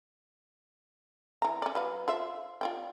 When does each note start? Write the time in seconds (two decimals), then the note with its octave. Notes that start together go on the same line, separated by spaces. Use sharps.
1.42 E3 A#5
1.62 C#4 D5
1.75 F#3 B4 F5
2.08 F4 C5 E5
2.61 F4 D5 G5